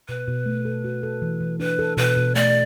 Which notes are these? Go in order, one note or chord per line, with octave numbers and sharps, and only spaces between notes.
B2 B4
B2
A3
A4
F#4
A4
E3
E3
D4 B4
A4
B2 B4
B2
A3 D5